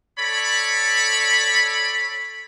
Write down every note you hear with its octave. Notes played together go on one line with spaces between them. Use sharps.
A4 C#5 D5 B5